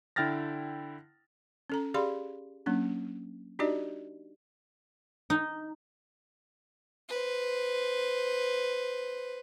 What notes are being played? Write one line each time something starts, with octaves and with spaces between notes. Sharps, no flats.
D3 E4 G5 F6 A6 A#6
C#4 A4 A#5
G4 G#4 D5 F5 B5 C6
F#3 A#3 C#4 D4
D4 D#4 F#4 G4 D5 D#5
D#4
B4 C5